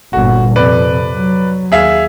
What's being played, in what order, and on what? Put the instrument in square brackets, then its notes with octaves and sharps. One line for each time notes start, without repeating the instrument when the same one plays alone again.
[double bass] G1 A#2 [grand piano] F#4
[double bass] F2 C3 [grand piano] B4 D5
[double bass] F#3
[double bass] D#2 [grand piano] G#4 E5 F5